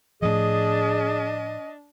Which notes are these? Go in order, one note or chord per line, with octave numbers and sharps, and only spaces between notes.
A2 F3 D4 G#4 D#5